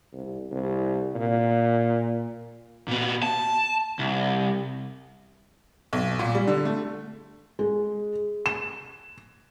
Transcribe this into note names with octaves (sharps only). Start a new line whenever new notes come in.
C2
C2
A#2
A#2 B3
A5
C2
B1
A#2
G3
D3
A3
G#3
E7